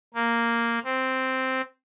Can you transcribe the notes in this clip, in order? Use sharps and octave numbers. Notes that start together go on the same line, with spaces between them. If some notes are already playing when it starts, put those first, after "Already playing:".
A#3
C4